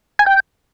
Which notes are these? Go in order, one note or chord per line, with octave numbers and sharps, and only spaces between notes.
G#5
G5